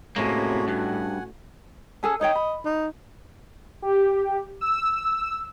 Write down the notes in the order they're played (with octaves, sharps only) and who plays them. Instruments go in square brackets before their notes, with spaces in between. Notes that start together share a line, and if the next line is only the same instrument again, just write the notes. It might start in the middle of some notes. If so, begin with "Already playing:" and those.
[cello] A2 [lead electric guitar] C3 A#3 [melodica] G#3 C#5 [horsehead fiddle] C#4 F#4
[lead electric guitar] G2 [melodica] F#5 G#5
[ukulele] C#4 G#4 A4
[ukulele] D#4 C#5 G5 [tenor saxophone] D#5
[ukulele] B5
[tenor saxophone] D#4
[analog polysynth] G4
E6